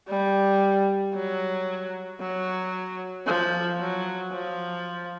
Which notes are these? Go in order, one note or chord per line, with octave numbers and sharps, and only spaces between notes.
G3
F#3
F#3
F3
F#3
F3